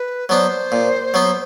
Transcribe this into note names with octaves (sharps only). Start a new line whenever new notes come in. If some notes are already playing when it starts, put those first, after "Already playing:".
Already playing: B4
F#3 B3 D4 C5
A#2
F#3 B3